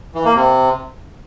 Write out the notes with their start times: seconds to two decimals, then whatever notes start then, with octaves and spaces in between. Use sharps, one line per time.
0.15 E3
0.25 A#3
0.35 C3